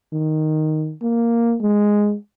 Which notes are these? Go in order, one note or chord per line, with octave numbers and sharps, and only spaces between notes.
D#3
A#3
G#3